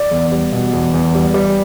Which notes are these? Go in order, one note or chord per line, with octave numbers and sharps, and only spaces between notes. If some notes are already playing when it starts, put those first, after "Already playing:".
Already playing: D5
E2
G3
B2
E2
E2
G3
G3